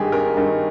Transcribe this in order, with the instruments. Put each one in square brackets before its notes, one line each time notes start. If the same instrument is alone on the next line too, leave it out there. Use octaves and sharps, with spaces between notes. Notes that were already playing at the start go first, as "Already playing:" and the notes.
Already playing: [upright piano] G#1 G2 D#3 G4 G#4
G#1 A#4
G2 D#3